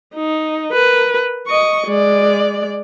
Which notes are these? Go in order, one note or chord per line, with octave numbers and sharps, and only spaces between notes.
D#4
A#4 B4
D#5 C#6
G#3 D5